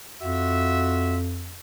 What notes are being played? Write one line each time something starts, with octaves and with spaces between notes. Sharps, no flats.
F2 F4 F#4 E5